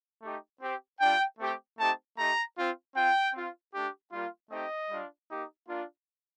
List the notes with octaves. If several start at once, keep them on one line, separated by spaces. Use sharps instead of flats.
A3 D#4 G4
C4 G4
G3 D4 F4 G5
A3 C4 G4
A3 C4 D#4 G4 A5
A3 D#4 G4 A#5
C4 F4
C4 F4 G5
C4 F4
A3 D4 G4
G3 A#3 F4
A3 C4 D#4 G4 D#5
G3 D4 F4
A#3 D#4 G4
A#3 D4 F4